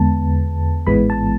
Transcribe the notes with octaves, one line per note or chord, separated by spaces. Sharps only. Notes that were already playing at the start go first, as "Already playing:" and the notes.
Already playing: E2 D3 G#3 B3 A5
A1 G#2 E3 G#3 B3 B5
A5